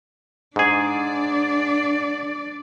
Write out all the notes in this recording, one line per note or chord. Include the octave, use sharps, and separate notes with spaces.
G#2 D4 G#4 D5